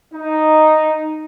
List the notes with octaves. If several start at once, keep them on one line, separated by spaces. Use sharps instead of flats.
D#4